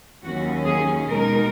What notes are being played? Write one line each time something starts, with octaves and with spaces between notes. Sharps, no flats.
D#2 D#3 F#3 C#4 F#4
G#4
B2 G#3 D#4 A#4